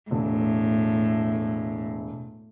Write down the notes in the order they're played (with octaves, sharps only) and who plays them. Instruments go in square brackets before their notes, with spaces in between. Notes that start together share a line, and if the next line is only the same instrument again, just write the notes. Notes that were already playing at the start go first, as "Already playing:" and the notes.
[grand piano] E1 [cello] A2